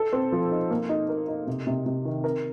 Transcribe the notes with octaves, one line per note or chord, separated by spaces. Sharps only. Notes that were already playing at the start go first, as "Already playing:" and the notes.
Already playing: A4
C4
F3
D#4
A#3
D#4
A#4
D#4
C3
C3
C3
D#3
A#4